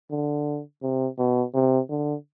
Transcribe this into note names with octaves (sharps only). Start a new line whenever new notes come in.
D3
C3
B2
C3
D3